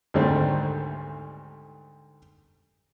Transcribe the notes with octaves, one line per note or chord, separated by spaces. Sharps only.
D2 G#2 D#3 G3 A3 C4